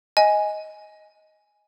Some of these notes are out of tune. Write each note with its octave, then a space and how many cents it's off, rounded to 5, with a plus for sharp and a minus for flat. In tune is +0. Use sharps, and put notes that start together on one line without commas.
D#5 +10 G#5 +0